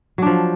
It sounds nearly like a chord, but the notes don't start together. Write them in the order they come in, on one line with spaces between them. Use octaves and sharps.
F#3 D4 F3